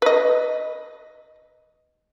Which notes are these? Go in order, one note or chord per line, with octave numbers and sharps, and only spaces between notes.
B4 D#5